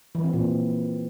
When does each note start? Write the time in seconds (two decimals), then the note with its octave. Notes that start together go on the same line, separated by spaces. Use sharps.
0.15 E3
0.24 C4
0.33 A#2